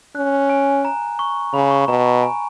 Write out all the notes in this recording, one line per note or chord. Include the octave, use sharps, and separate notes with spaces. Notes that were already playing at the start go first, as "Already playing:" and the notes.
C#4 F#6
G#5
A#5
C#6
C#3 B5
C#6
B2 A#5
A#5
G#5